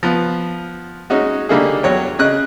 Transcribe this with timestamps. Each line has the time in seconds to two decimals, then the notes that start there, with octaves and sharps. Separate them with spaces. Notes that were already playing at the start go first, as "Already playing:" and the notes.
0.03 F3 B3
1.10 G#3 C#4 D#4 F#4
1.49 D3 G3 A3 A#3 D#4 G#4
1.83 E2 F#3 C#5 G5
2.19 C#3 D#5 F#6